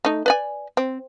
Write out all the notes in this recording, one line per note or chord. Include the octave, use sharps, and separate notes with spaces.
A3 D#4
B4 D5 G#5
C4